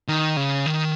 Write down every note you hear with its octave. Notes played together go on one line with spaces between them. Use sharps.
D#3
C#3
D#3